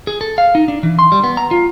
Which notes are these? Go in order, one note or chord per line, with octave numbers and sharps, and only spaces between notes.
G#4
A4
F5
D#4
D4
E3
C6
G3
B3
A#5
F4